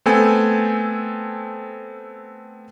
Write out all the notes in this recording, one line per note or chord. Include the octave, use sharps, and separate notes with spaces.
A3 B3 C4 A4 G#5